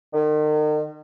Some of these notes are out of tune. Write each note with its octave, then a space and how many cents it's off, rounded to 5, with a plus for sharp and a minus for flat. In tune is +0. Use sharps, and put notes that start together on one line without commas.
D#3 -40